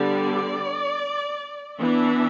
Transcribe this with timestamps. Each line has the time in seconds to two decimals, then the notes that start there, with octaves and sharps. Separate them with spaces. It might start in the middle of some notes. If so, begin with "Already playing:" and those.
Already playing: D3 G3 B3 D5
1.79 E3 B3 D4 E5